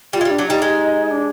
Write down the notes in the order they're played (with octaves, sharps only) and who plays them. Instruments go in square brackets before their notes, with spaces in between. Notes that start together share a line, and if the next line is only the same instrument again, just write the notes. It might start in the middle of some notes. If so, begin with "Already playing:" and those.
[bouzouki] G3 [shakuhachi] F4
[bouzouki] G#3
G3
[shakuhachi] D4
[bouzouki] F#3
[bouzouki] G3 [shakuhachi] D#4
[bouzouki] G#3
[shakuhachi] D4